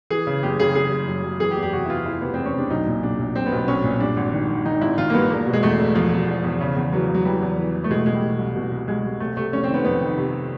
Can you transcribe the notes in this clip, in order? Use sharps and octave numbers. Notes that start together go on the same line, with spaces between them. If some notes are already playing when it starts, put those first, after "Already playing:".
E3 G#4
C#3
F#1 G4
C#3 G#4
F#1 G#4
F#1
F#2
F#2
E3 G#4
G4
E2
G4
C3 F#4
E4
E3 F4
E3 E4
C3 B3
E2 C4
C#4
C3 D4
B1 D#4
A#2
B1 D4
B1
B1 C4
B3
B1
B3
B1 C#4
A#2
G2 D4
G#1
D#3
D#3
D#3 D#4
G#1 E4
D#3 F4
A#3
G2 B3
E1 A#3
B2
G#3
E2 A3
E1
E1 F3
E1
E2
E2
C#3
E2
E3 F#3
C#3
F#3
E3 G3
E2
E3
E3
A3
B2 G#3
A3
B2 G#3
G3
B2
C2
B2
C2
C2 G#3
C2
C3 A3
C3 A3
F1 C#4
C4
D#3 B3
F2 B3
D#3
C3